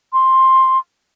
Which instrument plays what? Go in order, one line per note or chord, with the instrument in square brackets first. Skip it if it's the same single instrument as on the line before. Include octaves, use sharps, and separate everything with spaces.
[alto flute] C6